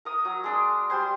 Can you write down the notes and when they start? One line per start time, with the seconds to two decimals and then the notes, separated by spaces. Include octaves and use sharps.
0.05 A#4 D#6
0.25 F#3
0.44 G#3 D4
0.90 G3 C5 G#5 C6